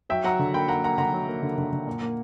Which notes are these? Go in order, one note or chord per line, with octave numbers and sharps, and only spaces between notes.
F#3 E5 G5
F#3 F#5 A#5
D3
A#3 G5 B5
A#3 F#5 A#5
A#3 F#5 A#5
D3 F#5 A#5
F#3
A#3
D3
D3
D3
A#2
A#3